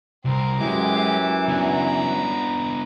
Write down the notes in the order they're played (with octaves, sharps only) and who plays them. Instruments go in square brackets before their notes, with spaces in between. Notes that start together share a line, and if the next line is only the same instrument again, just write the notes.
[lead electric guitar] C2 [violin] C4 A#4
[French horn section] F#2 C#4 [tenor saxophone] E3 [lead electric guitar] G#3 [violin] G4 D6
[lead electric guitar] B3 D4 [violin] A#5 B5